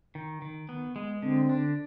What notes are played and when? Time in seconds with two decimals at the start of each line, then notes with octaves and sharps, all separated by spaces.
0.15 D#3
0.42 D#3
0.69 B3
0.96 G#3
1.22 D3 C4
1.49 D4